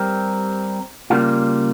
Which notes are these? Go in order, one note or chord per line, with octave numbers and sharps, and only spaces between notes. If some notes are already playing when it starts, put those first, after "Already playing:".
Already playing: G3 C4 G4 A#4
C#3 G3 A#3 F4